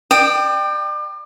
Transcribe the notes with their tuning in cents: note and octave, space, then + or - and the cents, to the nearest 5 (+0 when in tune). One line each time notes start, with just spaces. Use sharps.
D5 +35 G5 +0 D#6 -25